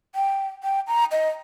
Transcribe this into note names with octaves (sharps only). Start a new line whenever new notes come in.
G5
G5
A#5
D#5